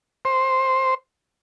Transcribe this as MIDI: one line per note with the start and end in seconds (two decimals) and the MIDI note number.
0.25 0.94 72